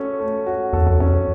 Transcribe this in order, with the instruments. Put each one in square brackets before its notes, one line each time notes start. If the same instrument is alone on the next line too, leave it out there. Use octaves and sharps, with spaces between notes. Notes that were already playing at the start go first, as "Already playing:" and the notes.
Already playing: [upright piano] A3 C#4 F#4 A4
A3
F#4
[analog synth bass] E2 [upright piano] A4
[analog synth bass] F2
[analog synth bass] F2 [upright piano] C#4